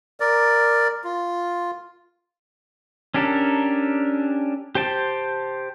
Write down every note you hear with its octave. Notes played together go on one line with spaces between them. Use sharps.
A#4 D5
F4
C#4 D4 G4 A4 A#4
G4 C5 G5 A5